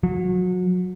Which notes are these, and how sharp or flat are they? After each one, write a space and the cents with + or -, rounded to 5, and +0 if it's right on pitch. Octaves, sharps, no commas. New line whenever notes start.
F#3 -30